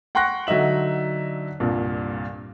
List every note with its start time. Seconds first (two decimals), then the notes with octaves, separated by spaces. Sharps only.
0.15 F#5 G5 C6 C#6 F#6 A#6
0.47 D3 F#3 D#4 D#5 E5 F#7
1.60 C2 G2 A#2